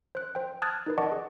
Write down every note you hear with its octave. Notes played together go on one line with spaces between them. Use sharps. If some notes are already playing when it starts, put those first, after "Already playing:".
C5 F#6
C5 G5
A5 D#6 F6 F#6 G#6 A6
D#4 A#4 B4
D5 D#5 F#5 A5 C#6 D6
G#4